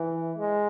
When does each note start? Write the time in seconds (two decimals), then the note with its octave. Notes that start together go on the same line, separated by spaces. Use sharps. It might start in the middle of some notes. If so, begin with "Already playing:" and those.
Already playing: E3
0.38 G#3